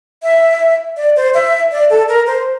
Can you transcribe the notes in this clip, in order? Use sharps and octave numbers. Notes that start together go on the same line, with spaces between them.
E5
D5
C5
E5
D5
A4
A#4
C5